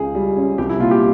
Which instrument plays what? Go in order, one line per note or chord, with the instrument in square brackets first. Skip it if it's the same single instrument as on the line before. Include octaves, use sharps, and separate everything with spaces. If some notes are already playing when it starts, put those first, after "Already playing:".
Already playing: [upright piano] C#2 C#3 [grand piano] G#4
[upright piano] G3
C#4
[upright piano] C2 [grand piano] G4
[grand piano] E4
[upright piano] A#2 [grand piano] F4
[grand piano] G4